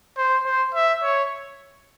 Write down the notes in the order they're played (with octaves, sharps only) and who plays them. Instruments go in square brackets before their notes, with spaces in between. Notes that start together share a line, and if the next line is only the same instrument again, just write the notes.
[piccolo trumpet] C5
C5
E5
C#5